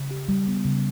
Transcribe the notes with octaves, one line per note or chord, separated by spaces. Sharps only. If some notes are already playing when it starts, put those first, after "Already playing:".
Already playing: C#3
G4
G3
B3
C#3